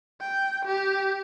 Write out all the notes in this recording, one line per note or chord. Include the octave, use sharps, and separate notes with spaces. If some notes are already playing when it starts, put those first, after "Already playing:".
G5
G4